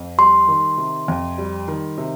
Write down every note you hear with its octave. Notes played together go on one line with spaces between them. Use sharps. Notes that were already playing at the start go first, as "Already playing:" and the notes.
Already playing: F2
G3 C6
D#3
C3
F2
G3
D#3
C3